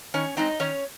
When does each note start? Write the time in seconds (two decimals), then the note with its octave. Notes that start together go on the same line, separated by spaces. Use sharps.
0.14 D#3 C#4 C#5
0.37 G#3 C4 D#4 D#5
0.60 D#3 C#4 C#5